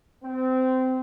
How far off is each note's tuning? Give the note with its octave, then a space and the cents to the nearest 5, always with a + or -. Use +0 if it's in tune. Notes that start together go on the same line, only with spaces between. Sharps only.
C4 -20